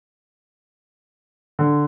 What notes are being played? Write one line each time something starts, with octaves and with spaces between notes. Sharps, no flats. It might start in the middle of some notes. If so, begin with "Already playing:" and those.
D3